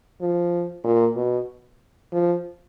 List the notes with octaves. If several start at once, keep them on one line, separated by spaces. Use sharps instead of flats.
F3
A#2
B2
F3